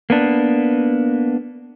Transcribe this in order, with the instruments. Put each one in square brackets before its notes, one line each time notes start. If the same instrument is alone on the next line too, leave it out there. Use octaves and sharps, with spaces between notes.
[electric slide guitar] A#3 B3 D4